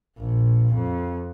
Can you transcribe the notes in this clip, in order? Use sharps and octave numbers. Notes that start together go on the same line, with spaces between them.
A#1
F2